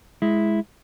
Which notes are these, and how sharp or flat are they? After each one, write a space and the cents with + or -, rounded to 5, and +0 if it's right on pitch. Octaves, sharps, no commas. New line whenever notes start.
G#3 +10 E4 +0